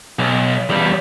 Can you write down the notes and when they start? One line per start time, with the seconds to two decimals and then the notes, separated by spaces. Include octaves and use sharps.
0.19 B1
0.69 E2 G3